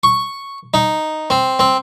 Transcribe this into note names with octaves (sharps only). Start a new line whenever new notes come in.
C#6
D#4
C4
C4